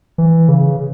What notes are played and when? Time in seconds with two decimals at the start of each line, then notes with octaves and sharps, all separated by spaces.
0.18 E3
0.49 C#3